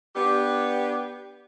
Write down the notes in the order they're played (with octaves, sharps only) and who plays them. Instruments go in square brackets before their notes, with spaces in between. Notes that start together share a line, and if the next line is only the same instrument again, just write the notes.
[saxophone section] B3 D4 G4